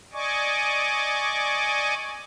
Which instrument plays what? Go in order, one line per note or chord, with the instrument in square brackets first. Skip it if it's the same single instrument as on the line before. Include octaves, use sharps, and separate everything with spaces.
[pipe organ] D5 D#5 G#5 C#6 D6